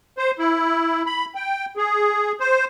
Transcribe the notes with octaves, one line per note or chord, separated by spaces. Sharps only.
C5
E4
B5
G5
G#4
C5